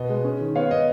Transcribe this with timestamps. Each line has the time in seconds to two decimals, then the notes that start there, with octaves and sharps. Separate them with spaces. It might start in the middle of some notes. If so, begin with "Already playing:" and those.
Already playing: B2 B3 D#5
0.09 G#3
0.24 C#4
0.41 D#3
0.55 B3 C#5 F5
0.71 B3 D#5